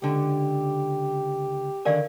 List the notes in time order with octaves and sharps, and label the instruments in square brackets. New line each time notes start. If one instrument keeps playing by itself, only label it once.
[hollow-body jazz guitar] C#2 D3 [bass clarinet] G4
[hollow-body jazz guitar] D3 D#3 G#5 [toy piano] A#4 D5 F5